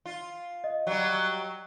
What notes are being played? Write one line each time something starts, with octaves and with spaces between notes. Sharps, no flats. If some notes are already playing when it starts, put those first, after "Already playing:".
F4
D#5
F#3 G3